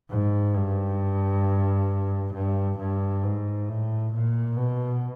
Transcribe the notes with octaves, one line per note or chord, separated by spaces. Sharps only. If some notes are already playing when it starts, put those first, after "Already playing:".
G#2
G2
G2
G2
G#2
A2
A#2
B2